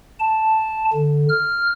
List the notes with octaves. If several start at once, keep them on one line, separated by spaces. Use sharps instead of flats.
A5
D3
F6